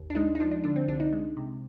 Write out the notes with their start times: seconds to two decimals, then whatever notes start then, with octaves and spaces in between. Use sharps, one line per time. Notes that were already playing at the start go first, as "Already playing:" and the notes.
Already playing: G#1 D#2
0.10 D4
0.15 G#3 D#4
0.35 D#4
0.40 F3 D4
0.51 D4
0.64 D3 D4
0.76 C4
0.88 C2 D4
1.00 D#4
1.13 G#3
1.37 C3